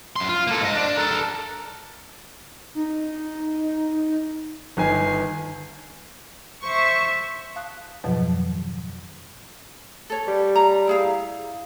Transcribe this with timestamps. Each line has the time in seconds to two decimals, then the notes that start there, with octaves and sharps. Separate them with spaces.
0.16 F#2 C6
0.29 F4
0.47 A#3 A4
0.61 G#2 D#5
0.75 D4
0.97 A4 A#4
2.75 D#4
4.77 G1 D#3 G#5 C7
6.65 C5 E5 C#6
7.56 F5 A5 D#6 F#6
8.04 F2 G#2 B2 D#3 F3 F#3
10.10 A4 C#5
10.28 G3
10.56 A#5
10.87 E4 G#4 F5